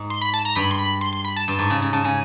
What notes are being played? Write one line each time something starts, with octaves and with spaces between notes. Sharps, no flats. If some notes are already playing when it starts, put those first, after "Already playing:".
Already playing: G#2
C6
B5
A5
A#5
G2 B5
C6
B5
C6
C6
B5
A5
G2
G#2
C#3
C#3
C#3 A5
C#3 G#5